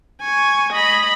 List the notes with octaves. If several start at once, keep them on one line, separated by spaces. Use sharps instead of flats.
G#5 C#6
D#5 B5